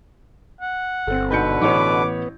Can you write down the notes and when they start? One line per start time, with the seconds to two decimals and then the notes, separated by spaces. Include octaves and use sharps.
0.61 F#5
1.07 G1 C4 A4
1.30 G#2 B2 D3 B4 G6 C#7
1.62 A1 B3 C#5 D6